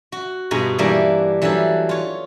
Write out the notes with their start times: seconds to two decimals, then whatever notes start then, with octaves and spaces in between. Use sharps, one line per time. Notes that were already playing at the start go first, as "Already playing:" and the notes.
0.12 F#4
0.51 G2 B2 F4 G#4 G#5 A#5
0.79 E3 G3 A#3 D4 A#4
1.42 E3 F#3 G3 D4 A4
1.89 F4 C#5